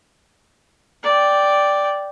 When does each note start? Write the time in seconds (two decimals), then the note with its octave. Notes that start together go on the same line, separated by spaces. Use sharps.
1.04 D5 G5